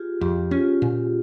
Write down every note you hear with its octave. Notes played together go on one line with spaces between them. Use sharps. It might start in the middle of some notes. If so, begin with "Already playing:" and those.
Already playing: F4 G4 G#4
F2 G4
C#4 F4
A#2